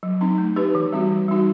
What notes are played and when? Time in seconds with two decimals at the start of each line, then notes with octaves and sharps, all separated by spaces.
0.03 F#3
0.21 C4 D#4
0.38 A3
0.56 D#4 G4 B4
0.75 E3
0.93 G3 C4 F#4
1.11 E3
1.28 G3 D#4 F#4